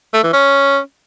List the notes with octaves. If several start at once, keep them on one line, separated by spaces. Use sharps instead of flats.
A3
E3
C#4